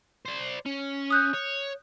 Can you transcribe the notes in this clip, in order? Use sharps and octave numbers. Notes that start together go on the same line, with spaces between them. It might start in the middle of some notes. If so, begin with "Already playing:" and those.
C5 D5
C#4
D#6 F#6 G6
C#5